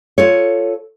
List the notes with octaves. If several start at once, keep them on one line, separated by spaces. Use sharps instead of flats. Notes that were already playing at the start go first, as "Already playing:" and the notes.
F4 A4 C#5